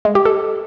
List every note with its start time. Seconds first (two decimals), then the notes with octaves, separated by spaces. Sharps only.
0.05 G#3
0.15 G4
0.25 A4